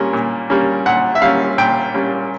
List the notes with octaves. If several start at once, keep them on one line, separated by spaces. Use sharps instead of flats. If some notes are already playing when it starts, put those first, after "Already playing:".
Already playing: A#2 G3 A#3 C#4
A#2
G3 A#3 C#4
A#2 F#5
E5
G3 A#3 C#4 F5
A#2 G5
G3 A#3 C#4